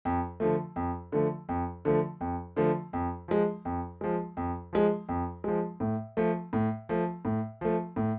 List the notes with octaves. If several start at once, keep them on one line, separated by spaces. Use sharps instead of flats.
F2
D3 F3 A3
F2
D3 F3 A3
F2
D3 F3 A3
F2
D3 F3 A3
F2
F3 G#3
F2
F3 G#3
F2
F3 G#3
F2
F3 G#3
A2
F3 A3
A2
F3 A3
A2
F3 A3
A2